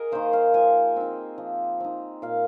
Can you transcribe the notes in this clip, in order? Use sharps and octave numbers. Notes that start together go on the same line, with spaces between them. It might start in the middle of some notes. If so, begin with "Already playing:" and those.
Already playing: G#4 A#4 D#5
D#3 A#3 C5
F5
F3 G#5
C4 D#4
F3
C4 D#4
A#2 F5